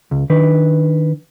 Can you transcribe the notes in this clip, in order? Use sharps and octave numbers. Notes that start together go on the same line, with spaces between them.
C#2
D#3 D4 B4